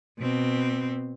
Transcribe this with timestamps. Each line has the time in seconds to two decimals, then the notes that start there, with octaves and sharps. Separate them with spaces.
0.19 B2 C4